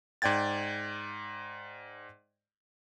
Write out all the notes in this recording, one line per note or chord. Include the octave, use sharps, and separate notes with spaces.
G#2 D5 G5 G#6 A6